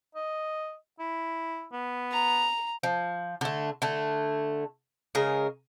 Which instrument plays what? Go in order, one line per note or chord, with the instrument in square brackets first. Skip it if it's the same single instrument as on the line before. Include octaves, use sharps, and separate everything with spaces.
[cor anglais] D#5
E4
B3
[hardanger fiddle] A#5
[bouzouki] F3
D3 A3
D3 A3
C#3 G#3 A#4